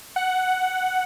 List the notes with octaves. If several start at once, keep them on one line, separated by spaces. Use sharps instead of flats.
F#5